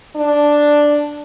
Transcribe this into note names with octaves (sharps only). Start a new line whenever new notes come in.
D4